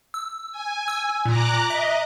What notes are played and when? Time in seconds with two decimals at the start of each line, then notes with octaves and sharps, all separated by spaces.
0.14 E6
0.52 G#5
0.88 E6
1.26 A#2 A#5 D6 F#6
1.70 D#5 E5